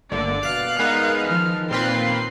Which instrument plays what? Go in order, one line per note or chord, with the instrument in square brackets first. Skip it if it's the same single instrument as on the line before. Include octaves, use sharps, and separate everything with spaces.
[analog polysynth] G1 D3 [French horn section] A3 A#3 [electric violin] D5
[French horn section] B2 [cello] F5 [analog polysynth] F#6
[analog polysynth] G#3 B3 D#4 [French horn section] A#4 [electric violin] F#6
[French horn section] D#3 [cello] F3 [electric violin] F6
[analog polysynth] A#2 F4 B4 [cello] C4 [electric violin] C6